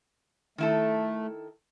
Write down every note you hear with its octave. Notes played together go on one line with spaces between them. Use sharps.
D#3 A3 E4 A4